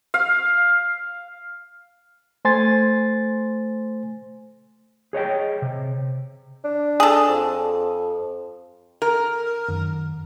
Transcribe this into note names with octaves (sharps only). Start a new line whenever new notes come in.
F5
A3 C5 G#5 C6 A6
G#4 C#5 D#5 G5
C3
D4
G#4 A4
F2
A#4
F#2 D#3